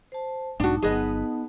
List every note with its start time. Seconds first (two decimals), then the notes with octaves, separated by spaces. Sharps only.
0.12 C5 A5
0.60 B1 G#2 B2 D4 D#4 F#4 A5
0.82 G1 F#3 B3 G#4 D#5